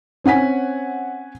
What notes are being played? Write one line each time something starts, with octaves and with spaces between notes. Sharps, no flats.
C4 C#4 F#5 G#5 B6